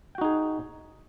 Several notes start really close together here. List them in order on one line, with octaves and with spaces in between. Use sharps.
G5 F#4 D#4 G#4